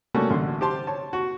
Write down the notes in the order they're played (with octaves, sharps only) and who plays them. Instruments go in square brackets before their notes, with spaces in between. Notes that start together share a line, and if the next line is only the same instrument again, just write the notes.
[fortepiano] G3 A3 A#3 C#4 F#4 F#5
A1 D3 C6
G4 C5 A5 C6
C#5 A5
F#4